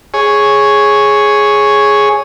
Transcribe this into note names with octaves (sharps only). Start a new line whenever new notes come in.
G#4 C#5